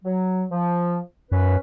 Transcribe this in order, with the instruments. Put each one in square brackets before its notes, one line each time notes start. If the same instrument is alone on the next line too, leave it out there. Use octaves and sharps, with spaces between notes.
[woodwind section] F#3
F3
[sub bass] F#2 [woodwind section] C#4 B4